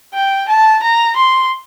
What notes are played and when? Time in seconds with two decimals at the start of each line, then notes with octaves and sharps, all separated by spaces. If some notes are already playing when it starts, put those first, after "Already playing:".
0.14 G5
0.49 A5
0.83 A#5
1.16 C6